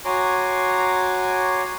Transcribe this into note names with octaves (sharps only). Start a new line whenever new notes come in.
F#4 C#5 G#5 A#5 C6 D6